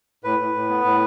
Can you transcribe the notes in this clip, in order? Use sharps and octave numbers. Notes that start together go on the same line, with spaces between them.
A2 B4
A2
A2
B3
A2